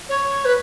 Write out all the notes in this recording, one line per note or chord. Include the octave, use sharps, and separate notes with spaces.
C#5
B4